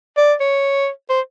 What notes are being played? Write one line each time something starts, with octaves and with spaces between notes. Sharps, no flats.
D5
C#5
C5